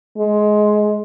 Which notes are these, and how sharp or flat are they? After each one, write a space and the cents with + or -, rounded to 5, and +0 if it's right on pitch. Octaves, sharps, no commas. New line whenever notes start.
G#3 +15